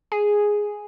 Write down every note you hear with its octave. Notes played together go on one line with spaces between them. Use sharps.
G#4